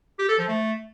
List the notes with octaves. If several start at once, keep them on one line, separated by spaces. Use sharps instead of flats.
G4
A4
F3
A3